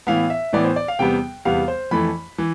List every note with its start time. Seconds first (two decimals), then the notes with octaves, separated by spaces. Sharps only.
0.07 A2 E3 B3 F5
0.30 E5
0.53 A2 E3 B3 D5
0.64 C5
0.76 D5
0.88 F5
0.99 E2 C3 G3 B3 G5
1.45 E2 C3 G3 B3 F5
1.68 C5
1.91 F2 E3 A3 B5
2.38 E3